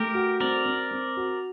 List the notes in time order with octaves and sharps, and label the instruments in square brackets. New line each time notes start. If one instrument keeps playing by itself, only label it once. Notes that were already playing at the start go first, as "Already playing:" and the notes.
Already playing: [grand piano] A3 [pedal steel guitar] G4 A#4
[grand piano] F#4
[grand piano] C4 [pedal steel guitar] A#4 D5
[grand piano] C4
C4
F#4